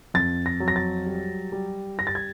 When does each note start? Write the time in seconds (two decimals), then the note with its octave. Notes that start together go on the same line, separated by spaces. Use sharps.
0.14 F2 A6
0.46 A#6
0.60 F#3
0.68 A#6
0.76 A6
1.06 G3
1.52 G3
1.98 G3 A#6
2.07 A6
2.15 G#6